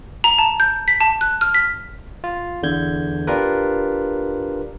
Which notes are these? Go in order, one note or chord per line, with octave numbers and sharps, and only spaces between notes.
A#5
A5
G6
B6
A5
F#6
F6
B6
F4
E2 D3 G6 G#6
D4 F4 G4 A#4 B4